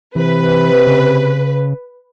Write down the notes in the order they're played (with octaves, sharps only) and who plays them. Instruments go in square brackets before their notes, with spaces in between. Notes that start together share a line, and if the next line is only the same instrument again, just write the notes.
[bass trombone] C3 [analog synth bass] E3 [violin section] B4
[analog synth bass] C#3